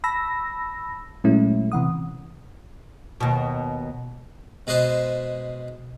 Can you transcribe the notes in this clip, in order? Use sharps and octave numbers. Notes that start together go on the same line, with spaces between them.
A5 B5 E6 A#6
A#2 F#3 G#3 A3 C#4 E4
C3 E3 F#5 D#6
D#2 B2
B2 G#3 G#4 B4 C5 A5